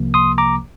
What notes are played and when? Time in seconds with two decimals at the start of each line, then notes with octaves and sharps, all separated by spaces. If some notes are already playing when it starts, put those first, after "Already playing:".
Already playing: C2 C3 F3 A#3
0.14 C6 D#6
0.38 A#5 D6